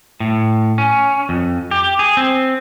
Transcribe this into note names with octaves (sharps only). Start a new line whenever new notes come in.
A2
C#4
F2
G4
G#4
C4